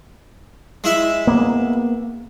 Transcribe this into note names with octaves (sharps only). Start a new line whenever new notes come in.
G#3 E4 E5
A#3 B3